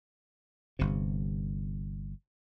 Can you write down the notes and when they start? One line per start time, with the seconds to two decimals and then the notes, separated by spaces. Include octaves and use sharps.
0.79 G1 C3